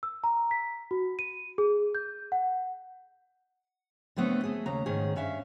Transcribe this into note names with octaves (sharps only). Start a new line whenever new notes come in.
E6
A#5
B6
F#4
D#7
G#4
G6
F#5
D3 F#3 A3 B3 C4
A3 G#4
D#2 C#3 A#5
G#2 D#3 C#4 G#4
G2 C#4 E5 F5